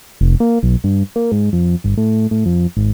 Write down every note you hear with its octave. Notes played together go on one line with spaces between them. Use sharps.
F1
A#3
B1
G2
A#3
G#2
F2
G1
A2
A2
F2
G#1